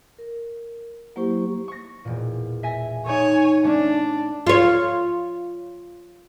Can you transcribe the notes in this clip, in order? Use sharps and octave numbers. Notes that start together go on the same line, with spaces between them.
A#4
F#3 A#3 E4 G4 C5 C#6
C#6 A#6
E1 A#2
E5 G#5 A#6
D#4 A4 C#5 G#5
A3 C#4 D4
F4 C#5